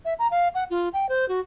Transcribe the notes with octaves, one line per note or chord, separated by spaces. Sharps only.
E5
A#5
F5
F#5
F4
G5
C5
F#4